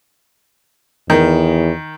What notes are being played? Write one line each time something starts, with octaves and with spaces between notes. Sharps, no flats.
E2 D#3